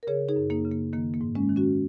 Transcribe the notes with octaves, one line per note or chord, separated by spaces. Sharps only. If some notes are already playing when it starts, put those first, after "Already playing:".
A#4
C#3 G#4 C#5
D#4 G#4
F#2
A#3 D#4
C#3
A#3
D#3 A#3
A#3
G#2
G#3 C#4
D#3
C#4 F#4